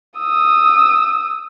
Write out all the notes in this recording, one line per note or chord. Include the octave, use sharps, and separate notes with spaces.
D#6 E6